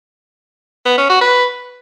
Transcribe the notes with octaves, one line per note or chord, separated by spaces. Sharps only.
B3
C#4
F#4
B4